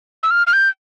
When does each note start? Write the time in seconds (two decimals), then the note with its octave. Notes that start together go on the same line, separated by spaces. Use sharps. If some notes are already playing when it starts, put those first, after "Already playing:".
0.23 E6
0.31 F6
0.47 F6
0.53 G6